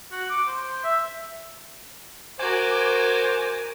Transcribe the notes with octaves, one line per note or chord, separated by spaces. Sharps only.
F#4
D6
C5
E5
F#4 A#4 C5 G#5 D6